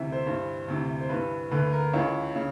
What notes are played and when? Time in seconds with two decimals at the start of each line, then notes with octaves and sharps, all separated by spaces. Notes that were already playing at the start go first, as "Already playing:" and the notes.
Already playing: D2 C3 E3 E5
0.12 C5
0.26 G2 E3
0.68 D2 C3 E3
1.01 C5
1.09 G2 E3 B4
1.51 D2 D3 B4
1.73 A#4
1.93 C#2 C#3 E3 C#5
2.36 C#3